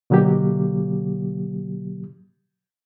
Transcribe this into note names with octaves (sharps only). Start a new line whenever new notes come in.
B2 D3 F#3 A#3 G4